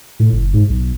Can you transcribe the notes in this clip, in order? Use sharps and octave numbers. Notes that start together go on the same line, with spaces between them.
A2
F#1
G#2
B1